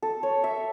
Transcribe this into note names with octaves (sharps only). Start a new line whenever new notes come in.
A4
C#5
E5